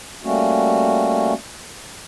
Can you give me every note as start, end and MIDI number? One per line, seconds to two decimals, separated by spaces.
0.24 1.33 55
0.24 1.33 57
0.24 1.33 58
0.24 1.33 61
0.24 1.33 66